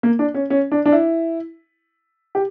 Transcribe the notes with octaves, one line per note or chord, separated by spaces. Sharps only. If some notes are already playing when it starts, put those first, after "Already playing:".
A#3
D4
C#4
C#4
D4
D4
E4
G4